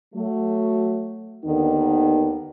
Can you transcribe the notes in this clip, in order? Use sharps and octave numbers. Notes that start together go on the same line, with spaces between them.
F#3 A3
D#2 D3 D#3 B3 D4 D#4